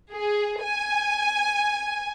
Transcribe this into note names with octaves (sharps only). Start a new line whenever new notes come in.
G#4
G#5